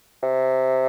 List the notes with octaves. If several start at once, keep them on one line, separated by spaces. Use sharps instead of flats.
C3